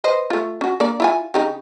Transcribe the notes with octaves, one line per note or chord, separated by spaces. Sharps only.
B4 C5 D#5
A3 F4
C#4 F#4
A#3 D4 D5
E4 F4 G#5
C#3 D#4 G4